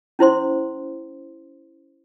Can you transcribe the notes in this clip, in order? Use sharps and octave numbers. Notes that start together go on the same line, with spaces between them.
C#4 E4 C5 C6